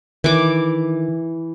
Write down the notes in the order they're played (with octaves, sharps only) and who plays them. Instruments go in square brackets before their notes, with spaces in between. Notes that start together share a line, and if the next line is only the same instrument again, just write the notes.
[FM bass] D#3 [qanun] E3 D6